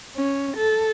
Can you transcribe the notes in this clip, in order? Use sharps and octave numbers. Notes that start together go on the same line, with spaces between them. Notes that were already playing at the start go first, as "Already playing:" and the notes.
C#4
A4